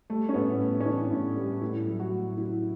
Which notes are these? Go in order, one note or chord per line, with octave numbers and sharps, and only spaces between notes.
G3 A3
C#4
A2 B3
A2
C#4
E3 D4
A2
G3
A2 E4
F#3
F#4
A2
A2 E4